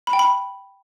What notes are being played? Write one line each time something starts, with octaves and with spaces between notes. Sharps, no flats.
B5
G5
B5